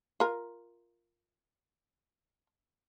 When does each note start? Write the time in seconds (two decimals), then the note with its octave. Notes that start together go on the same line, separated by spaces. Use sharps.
0.20 F4 A#4